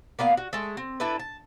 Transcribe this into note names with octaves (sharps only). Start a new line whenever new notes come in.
A#3 B3 D5 F5
F#4
G#3 A3 A4
C4
D4 E4 A4 B4
A5